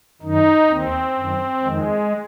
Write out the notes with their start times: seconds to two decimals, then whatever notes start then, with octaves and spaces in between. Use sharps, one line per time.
0.22 F#2 D#3 D#4
0.69 D#2 D#3 C4
1.16 F#2 D#3
1.63 F2 D#3 G#3